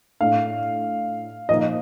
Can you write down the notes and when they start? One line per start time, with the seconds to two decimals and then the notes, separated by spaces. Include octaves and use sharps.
0.20 A2 A3 D4 F5
1.49 A#2 F3 A#3 D#4 D#5